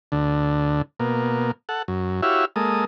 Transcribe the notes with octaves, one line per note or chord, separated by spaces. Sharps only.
D2 D3
B2 A#3
A4 F#5
F#2
E4 F#4 G4 C#5 E5 F5
G#3 A#3 A4 D#6